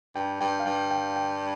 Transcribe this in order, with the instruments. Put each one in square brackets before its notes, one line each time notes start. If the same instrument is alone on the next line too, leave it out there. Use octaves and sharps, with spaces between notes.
[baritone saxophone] G2 [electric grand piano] G5
[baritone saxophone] G2 [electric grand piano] G5
[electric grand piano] F5
[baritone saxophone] G2 [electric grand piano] G5
[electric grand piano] G5
G5